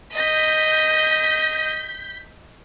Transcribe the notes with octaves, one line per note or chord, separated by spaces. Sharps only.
D#5 G6 B6